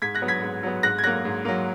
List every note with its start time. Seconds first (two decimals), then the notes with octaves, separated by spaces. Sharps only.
0.02 G#2 G#6 B6
0.15 F#6 A#6
0.22 F#3 B3
0.28 G#6 B6
0.42 G#2
0.63 F#3 B3
0.83 G#2 F#6 A#6
0.98 G#6
1.04 F#3 A#3 F#6 A#6
1.25 G#2
1.45 F#3 A#3